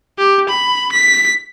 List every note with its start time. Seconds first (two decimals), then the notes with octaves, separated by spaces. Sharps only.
0.18 G4
0.50 B5
0.93 B6